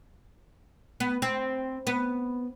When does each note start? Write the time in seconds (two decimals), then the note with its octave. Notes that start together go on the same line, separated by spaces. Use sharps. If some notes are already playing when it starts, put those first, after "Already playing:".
1.00 B3
1.22 C4
1.87 B3